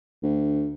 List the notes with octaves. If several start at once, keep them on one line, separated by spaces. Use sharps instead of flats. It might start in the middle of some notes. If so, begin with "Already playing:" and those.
D2